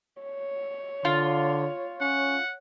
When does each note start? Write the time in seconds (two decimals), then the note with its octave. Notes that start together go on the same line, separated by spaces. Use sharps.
0.21 C#5
1.05 D3 F4
2.01 C#4 F#5